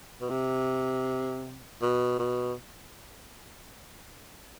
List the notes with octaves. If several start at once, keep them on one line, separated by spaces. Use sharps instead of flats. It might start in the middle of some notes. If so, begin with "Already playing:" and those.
B2
C3
B2
B2